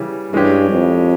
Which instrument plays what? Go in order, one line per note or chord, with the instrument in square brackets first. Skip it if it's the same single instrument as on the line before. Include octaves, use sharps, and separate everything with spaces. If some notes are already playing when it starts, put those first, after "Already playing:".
Already playing: [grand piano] C#3 E3 G3
[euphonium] G2 [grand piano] E3 G#3 C#4 G4
[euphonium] F2